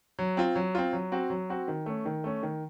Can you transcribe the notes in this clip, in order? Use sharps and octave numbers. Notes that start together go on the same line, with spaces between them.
F#3
C4 F4
F#3
C4 F4
F#3
C4 F#4
F#3
C4 F#4
D#3
A3 C#4
D#3
A3 C#4
D#3